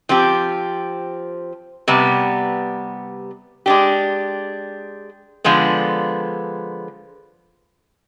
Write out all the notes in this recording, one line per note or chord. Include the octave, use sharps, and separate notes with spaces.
F3 C4 G4
C3 G3 B3
G#3 D4 G4
D3 F3 G#3 B3